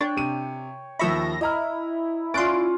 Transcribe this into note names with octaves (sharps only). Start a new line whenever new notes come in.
D4 C#5 G5
C3 D#7
D#2 F3 E5 B5 C#6 E6 A#6
E4 D#5 A#5 F6
C#4 F4 D5 C6 F#6 A6 D7